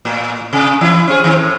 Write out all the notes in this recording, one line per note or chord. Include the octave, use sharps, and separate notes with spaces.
A2
C3
E3 E4
C4 C#4 G#4
D#3 C4
A2